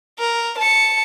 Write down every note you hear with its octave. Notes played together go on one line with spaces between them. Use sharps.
A#4
A5 C#7